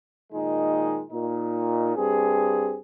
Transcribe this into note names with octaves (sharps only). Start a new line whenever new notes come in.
A#2 D#3 G#3 D#4
A#2 D#4
G2 C4 G#4